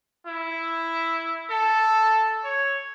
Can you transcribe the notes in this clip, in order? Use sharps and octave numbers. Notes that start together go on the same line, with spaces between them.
E4
A4
C#5